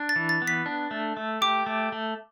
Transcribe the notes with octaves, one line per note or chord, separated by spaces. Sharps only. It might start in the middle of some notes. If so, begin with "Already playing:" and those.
Already playing: D4
A6
E3
A6
B3
B6
D4
A3
A3
G4 D6
A3
A3